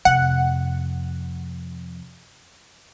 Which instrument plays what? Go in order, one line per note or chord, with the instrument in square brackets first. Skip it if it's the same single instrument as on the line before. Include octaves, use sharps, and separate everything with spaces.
[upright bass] F2 C3 [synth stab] F#5